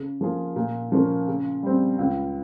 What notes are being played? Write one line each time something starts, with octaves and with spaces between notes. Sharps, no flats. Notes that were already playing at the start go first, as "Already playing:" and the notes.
Already playing: C#3
F3 A#3 F4 G#4
A#2
F3 A#3 C#4
C#3
G3 C4
C#2